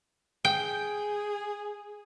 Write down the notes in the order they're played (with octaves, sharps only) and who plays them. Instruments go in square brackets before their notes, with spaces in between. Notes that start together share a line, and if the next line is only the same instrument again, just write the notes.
[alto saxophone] G#4 [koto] G5